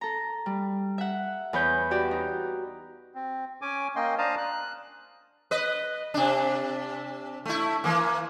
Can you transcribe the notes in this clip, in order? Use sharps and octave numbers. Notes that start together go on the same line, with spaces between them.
A4 A#5
G3
E5 F#5
E2 B4 C#5 G6
F#4 G4 D5
D#4
C4
C#4 G#5 D6
A#3 C#4 D#5 G5 C6
D4 C5 F5 A5 A#5 D#6
F#6
B4 D#5
C3 D4
A3 E4
E3 A#3